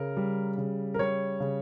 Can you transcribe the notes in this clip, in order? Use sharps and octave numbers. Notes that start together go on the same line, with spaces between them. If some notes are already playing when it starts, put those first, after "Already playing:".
Already playing: C#3 A#4
G3
C#3
A#4
G3 C#5
C#3